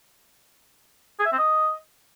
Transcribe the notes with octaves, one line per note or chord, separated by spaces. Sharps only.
G#4
E5
C4
D#5